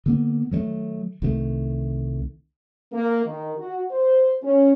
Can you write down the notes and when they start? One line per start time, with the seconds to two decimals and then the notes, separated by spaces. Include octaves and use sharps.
0.06 D3 A#3 B3
0.51 D#3 F#3 G3 A3
1.22 C2 D#3 F#3 A3
2.93 A#3
3.25 D#3
3.58 F#4
3.90 C5
4.43 C#4